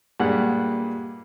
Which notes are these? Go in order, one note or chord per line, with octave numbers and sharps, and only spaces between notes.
G2 A#2 G#3 F#5 F#6